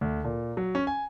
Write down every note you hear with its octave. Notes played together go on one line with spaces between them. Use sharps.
D2
A#2
F#3
C#4
G#5